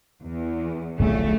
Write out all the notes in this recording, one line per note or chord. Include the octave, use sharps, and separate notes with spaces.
E2
D1 A#1 A2 C#3 F#3 A3